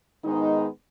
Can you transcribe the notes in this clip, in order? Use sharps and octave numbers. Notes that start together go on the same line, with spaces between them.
G#2 D#3 G#3 B3 D#4